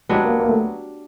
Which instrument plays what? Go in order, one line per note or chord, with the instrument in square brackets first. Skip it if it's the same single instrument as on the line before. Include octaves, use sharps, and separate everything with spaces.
[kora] F#3 B3 D4 G4 [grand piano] G#3
[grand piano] A#3
A#3
A3